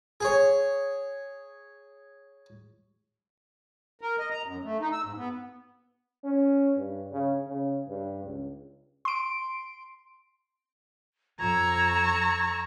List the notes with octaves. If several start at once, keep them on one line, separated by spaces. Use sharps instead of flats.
G#4 C#5
A#4
D#5
A#5
F#2
A3
D#4
E6
G#2
B3
C#4
G2
C#3
C#3
G2
C#2
C6 D7
F2 A#5 C#6 E6 G#6